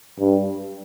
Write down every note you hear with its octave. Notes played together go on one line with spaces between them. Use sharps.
G2